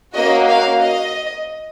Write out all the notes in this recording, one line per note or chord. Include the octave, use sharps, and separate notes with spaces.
A#3 C#4 F#4 D#5
F5
D#5